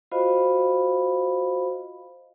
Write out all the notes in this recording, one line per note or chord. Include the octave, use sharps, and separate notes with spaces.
F4 F#4 C5 D#5 F5 B5